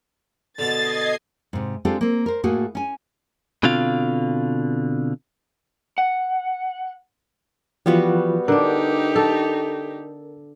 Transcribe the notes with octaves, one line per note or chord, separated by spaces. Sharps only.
B2 D3 D#5 G#6 A6 C7
G#2 C3
G#3 C4 D4 F4 G4 A4
A#3 C4
A#4 C5
A2 A3 A#3 F#4 G#4
C#4 G#5
B2 D3 C4 F4 F5
F#5
E3 F3 G3 B3 F4 F#4
D3 D4 D#4 G4 A#4
A4